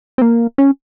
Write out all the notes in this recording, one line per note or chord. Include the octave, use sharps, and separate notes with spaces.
C4
A#3
C#4